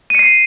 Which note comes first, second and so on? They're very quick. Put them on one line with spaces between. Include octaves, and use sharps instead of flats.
D#7 C#7 C7